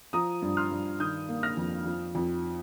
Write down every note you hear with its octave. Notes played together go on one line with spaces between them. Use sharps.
F3 A#5 D#6
G2
C6 F6
G2
D#3 D#6 G6
A#3
F6 A#6
F2
F3
F2